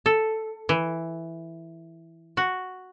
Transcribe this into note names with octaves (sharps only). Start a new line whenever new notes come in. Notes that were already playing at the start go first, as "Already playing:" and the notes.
A4
E3
F#4